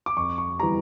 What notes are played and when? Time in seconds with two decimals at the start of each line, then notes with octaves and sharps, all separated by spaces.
0.06 D6
0.17 F2 C#6
0.38 C#6
0.60 E3 G3 A#5